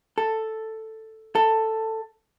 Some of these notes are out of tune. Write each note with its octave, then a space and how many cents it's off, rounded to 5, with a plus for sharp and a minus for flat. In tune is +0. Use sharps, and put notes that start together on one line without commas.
A4 +5
A4 +10